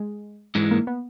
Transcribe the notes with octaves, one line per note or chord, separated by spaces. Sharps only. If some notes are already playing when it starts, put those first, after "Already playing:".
Already playing: G#3
G#2 E3 G#3
A#3
B3